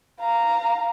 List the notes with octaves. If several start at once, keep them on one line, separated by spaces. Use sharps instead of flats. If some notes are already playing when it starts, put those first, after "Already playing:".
F5 A#5